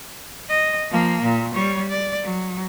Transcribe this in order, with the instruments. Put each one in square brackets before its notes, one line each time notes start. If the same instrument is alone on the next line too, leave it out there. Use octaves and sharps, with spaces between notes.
[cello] D#5
F3 A#3
A#2
G3 C#5
D5
F#3